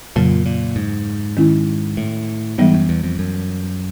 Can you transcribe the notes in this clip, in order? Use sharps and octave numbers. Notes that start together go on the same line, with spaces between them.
F2 A#2 C#3 F#3
A#2
G#2
D#3 G#3 C#4 E4
A2
G#2 E3 G3 B3
F#2
E2
F2
F#2